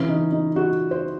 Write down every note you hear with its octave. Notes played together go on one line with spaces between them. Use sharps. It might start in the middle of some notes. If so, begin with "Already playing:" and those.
Already playing: C#3 E3 C#4
D#4
D#4
F#4
C5